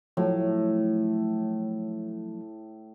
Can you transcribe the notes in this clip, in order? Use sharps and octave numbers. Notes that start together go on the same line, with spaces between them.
A2 F3 F#3 A3